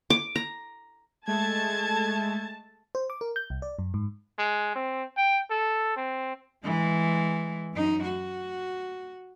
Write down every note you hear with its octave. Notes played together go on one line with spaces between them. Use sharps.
D6
A#5
G#3 A3 A5 G#6
C5
D6
A#4
G6
C2
D5
F#2
G#2
G#3
C4
G5
A4
C4
E3 G#3
F#2 D#4
F#4